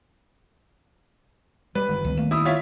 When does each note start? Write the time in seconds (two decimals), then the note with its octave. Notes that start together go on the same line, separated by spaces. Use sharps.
1.75 G3 G#3 B4
1.88 G1 D#3
2.05 C#2 D#3 G3 B3
2.17 A3 A#3
2.31 E4 D#6
2.45 F4 C#5 E5